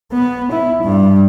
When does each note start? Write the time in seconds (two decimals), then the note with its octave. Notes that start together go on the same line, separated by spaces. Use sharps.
0.12 B3
0.51 E4
0.83 G2